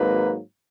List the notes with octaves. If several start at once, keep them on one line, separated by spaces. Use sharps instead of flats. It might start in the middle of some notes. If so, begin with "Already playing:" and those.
Already playing: G#1 G#2 F#3 A#3 B4